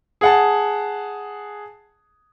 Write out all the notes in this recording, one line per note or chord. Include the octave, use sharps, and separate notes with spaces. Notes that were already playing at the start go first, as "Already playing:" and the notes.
G#4 F#5 A5